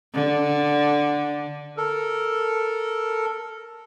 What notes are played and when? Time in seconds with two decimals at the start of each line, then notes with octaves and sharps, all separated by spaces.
0.14 D3
1.77 A4 A#4